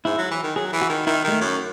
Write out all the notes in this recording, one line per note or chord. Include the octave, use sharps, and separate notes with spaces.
G#2 E4
F#3
E3
D#3
F#3 G#4
E3
F#4
D#3
D#3 E4
D#3 G#3
A3
F#2